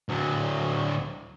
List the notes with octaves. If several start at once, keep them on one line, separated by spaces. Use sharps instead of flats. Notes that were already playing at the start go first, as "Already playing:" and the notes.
D2 F#3